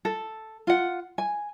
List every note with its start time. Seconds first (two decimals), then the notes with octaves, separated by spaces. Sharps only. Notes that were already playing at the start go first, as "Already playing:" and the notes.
0.05 A4
0.67 F4 F#5
1.18 G#5